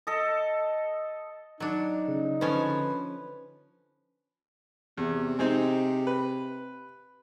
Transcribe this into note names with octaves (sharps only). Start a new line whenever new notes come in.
A4 D#5
F#3 D4 D#4
C#3
D3 F3 C#4 B4
E2 C3
G#3 C4 D#4
B4